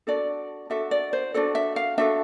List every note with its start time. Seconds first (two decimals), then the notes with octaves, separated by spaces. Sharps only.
0.07 D4 F#4 A4 D5
0.70 D4 F#4 A4 E5
0.91 D5
1.13 C5
1.34 D4 F#4 A4 D5
1.55 E5
1.76 F5
1.98 D4 F#4 A4 E5